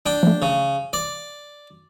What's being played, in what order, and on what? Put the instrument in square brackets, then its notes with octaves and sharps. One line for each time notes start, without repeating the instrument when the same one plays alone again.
[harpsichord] D4 G5
[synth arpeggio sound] F3 A3
[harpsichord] C#3
D5